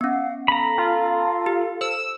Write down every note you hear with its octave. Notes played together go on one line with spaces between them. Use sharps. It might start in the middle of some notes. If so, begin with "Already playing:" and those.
B3 C#4 F5 F#5
A4 F5 A#5 B5
F4
G4
C5 E6